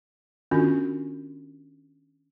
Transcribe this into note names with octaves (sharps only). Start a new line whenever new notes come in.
D#3 B3 C#4 D4 F4 F#4